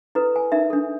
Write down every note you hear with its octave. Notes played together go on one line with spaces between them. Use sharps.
E4 A4 B4
G#5
D#4 A#4 E5
D4 A4